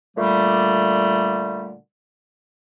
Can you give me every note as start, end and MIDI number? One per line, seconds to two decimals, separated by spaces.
0.17 1.75 46
0.17 1.75 50
0.17 1.75 55
0.17 1.75 57